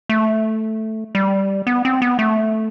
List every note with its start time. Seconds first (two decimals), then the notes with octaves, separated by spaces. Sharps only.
0.09 A3
1.15 G3
1.67 B3
1.85 C4
2.02 B3
2.19 A3